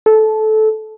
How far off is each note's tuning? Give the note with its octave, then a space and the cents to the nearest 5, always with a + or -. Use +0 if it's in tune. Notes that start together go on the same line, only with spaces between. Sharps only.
A4 -15